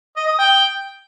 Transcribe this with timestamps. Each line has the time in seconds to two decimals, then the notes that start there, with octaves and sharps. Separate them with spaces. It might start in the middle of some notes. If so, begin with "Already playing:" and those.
0.16 D#5
0.27 D#6
0.39 G5